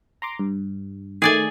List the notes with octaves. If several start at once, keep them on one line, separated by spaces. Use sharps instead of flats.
A#5 C6 D6
G2
D#3 A3 G#4 D5 G#5